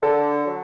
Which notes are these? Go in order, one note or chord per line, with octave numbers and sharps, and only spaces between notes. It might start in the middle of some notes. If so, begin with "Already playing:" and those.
D3 A4
F#3